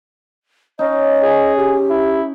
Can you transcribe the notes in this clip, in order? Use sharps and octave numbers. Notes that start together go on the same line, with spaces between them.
C#4 D#4 D#5
G#4
G4
E4